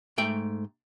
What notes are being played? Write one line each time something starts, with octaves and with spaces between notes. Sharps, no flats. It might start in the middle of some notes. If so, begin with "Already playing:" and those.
G#2 A3 G5